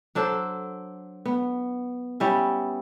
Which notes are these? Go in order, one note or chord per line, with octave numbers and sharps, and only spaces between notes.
F#3 D4 A4 C5
B3
G3 B3 C#4 E4